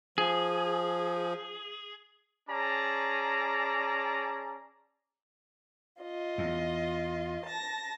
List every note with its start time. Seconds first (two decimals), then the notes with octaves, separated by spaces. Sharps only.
0.18 F3 G#4
2.49 C#4 G#4 D5 A5 A#5
6.01 F4 D#5
6.38 E2
7.46 A5 A#6